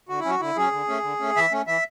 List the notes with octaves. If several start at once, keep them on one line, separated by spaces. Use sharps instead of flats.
D3 F#4
E4
F#3 C#4 F#4
D3 E4
F#3 C#4 G#4
D3
A3 C#4
D3
A3 C#4
E3 E5
A3 C#4
E3 E5